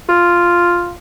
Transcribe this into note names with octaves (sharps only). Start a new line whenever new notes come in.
F4